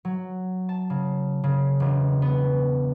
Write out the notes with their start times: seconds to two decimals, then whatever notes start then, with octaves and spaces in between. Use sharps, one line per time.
0.05 F#3
0.69 A5
0.90 C#3
1.44 C#3
1.80 E1
2.22 B3